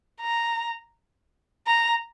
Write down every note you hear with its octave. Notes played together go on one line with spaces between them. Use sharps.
A#5
A#5